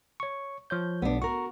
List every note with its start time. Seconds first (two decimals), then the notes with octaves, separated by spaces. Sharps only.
0.20 C#5 C#6
0.70 F3 C#5 G6
1.02 B1 B3 D4
1.22 F#4 A#4 A#5 C#6